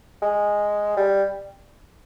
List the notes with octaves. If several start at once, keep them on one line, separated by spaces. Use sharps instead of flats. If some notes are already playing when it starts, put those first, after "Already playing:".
G#3
G3